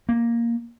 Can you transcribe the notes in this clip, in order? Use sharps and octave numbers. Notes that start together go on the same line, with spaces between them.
A#3